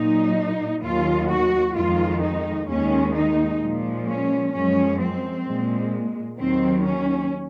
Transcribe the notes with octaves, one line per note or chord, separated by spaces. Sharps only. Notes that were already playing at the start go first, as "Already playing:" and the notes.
Already playing: A#2 F#3 D#4
D#2 D#3 F#3 F4
F#4
F2 D#3 G#3 F4
D#4
D#2 D#3 G#3 C#4
D#4
A#2 F3 G#3
C#4
F#2 F3 G#3 C#4
C4
A#2 G#3
D#2 D#3 F#3 C4
C#4